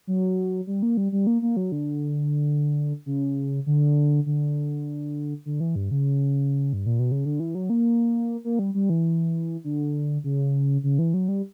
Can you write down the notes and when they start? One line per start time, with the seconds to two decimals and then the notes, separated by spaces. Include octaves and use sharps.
0.07 F#3
0.67 G3
0.83 A#3
0.97 G3
1.12 G3
1.27 A#3
1.42 A#3
1.57 F#3
1.72 D3
3.06 C#3
3.66 D3
4.26 D3
5.46 D3
5.60 E3
5.75 G2
5.91 C#3
6.73 G2
6.86 A#2
6.99 B2
7.11 C#3
7.25 D3
7.40 E3
7.55 F#3
7.70 A#3
8.44 A#3
8.59 G3
8.74 G3
8.90 E3
9.64 D3
10.24 C#3
10.83 C#3
10.99 E3
11.14 F#3
11.28 G3